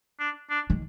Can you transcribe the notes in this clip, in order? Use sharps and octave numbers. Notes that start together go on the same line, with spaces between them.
D4
D4
D#3